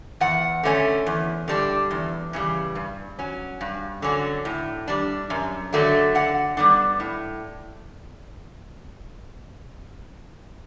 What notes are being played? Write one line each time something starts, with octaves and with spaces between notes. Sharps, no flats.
E2 F#5
D3 A3 C#4
E2
D3 G3 D4
E2
C#3 E3 G3
G2
F#3 C#4
G2
D3 F#3 C#4
A2
G3 D4
F#2
D3 F#3 A3 D4
D3 F#5
G3 B3 D4
A2